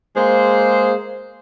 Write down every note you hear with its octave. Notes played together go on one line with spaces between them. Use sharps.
G#3 A#3 G#4 C5